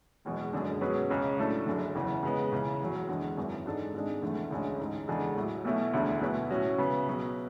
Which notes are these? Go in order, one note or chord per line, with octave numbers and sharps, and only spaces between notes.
F#1 E2 B2 G#3
F#1 F#2 D3 G#3 D4
B2 F#3 C#4 G#4 B4
C#2 C#3 G#3 C#4
A2 F#3 A3 D4 A4
F#1 F#2 D3
F#1 E2 C#3 E3
C#3 G#3 B3
C#2 C#3 E3
F#1 E2 C#3 F#3
E2 D3 G#3
G#1 F#2 E3
G#2 G#3 D4 A4
G#1 G#2 G#3 D4
F#1 E2 D3 A3
D2 D3 G#3 C#4
A1 G#2 G#3
E2 C#3 G#3 D4 A4
A1 A2 F#3
B1 B2 A3 E4
E1 D2 D3 A3 E4
B1 B2 A3 E4 B4
A2 F#3 C#4 F#4
C#3 F#3 B3
C#2 B2 F#3 B3